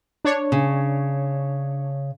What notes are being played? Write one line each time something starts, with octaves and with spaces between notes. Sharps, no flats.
D4 C#5
C#3